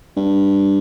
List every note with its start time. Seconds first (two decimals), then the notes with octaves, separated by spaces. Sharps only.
0.17 G2